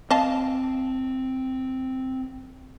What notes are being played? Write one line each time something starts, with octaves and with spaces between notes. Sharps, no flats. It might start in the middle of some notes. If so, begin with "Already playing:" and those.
C4 D#5 F5 A5